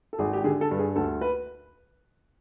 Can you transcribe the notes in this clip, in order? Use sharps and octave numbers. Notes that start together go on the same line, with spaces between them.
A4
G#1 G#4
G4
D3 G#4
A4
G2
G#4
D2 A4
B4